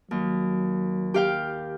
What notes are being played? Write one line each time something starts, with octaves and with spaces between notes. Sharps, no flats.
D#2 F#3
G4 F5 G5